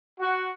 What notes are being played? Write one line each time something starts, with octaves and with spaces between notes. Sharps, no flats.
F#4